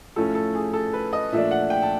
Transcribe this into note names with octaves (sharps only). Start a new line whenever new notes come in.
A2 F3 A3 C#4 A4
A4
G#4
A4
B4
D#5
A#2 F3 A3 D4 E5
F#5
G5
A5